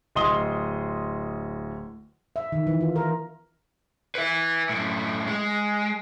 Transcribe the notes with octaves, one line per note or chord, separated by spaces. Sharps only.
D1 D#5 C6 D#6 G7
E5
D#3
E3
F4
A#4
B4 E5
F#2 A2
G#3